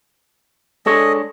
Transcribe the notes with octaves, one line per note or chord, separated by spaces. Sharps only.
G#3 D4 A4 C#5 D#5